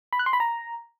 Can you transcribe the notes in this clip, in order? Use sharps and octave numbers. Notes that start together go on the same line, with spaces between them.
B5
F#6
C6
B5
A#5